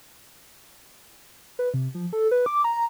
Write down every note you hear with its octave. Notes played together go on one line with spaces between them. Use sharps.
B4
C3
F3
A4
B4
D6
A#5